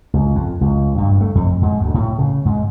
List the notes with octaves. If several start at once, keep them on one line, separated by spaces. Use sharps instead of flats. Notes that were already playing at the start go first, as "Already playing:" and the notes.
C#2
F2
C#2
G2
A3
F2
G#2
D2
A2
C#3
G#2